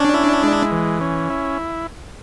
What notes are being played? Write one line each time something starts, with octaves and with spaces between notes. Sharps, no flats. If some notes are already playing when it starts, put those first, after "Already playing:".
Already playing: C#4 D4
E4
G#3
E3
C#4
E4